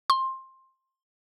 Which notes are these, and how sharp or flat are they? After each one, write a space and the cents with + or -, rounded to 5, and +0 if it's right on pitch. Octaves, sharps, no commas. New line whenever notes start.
C6 +15